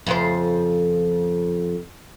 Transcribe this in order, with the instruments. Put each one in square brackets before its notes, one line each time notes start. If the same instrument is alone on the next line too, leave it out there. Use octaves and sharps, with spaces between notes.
[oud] F2 C#3 C5